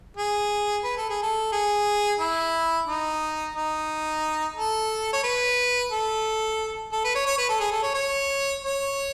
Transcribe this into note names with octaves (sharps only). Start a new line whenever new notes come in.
G#4
B4
A4
G#4
A4
G#4
E4
D#4
D#4
A4
C#5
B4
A4
A4
B4
C#5
C#5
B4
A4
G#4
A4
C#5
C#5
C#5